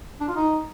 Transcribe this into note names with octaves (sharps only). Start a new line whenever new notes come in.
D4
F4
D#4